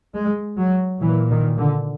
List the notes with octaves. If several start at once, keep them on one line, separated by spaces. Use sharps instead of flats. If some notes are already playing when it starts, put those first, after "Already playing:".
G#3
F#3
A#2 E3
D#3
D3